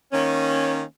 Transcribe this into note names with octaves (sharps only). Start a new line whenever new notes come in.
D#3 A#3 C#4